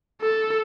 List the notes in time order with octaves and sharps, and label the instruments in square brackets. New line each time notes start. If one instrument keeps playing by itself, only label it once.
[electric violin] A4